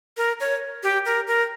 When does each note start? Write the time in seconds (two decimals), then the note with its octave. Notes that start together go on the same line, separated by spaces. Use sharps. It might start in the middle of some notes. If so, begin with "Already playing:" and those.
0.17 A#4
0.40 C#5
0.83 G4
1.05 A#4
1.28 A#4